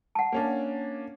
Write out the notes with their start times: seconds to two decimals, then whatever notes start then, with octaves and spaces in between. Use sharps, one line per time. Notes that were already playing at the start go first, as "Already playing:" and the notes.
0.15 F#5 A5
0.32 A#3 C#4 D4